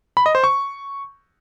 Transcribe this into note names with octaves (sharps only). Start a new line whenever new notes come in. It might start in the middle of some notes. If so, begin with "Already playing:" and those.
B5
D#5
C5
C#6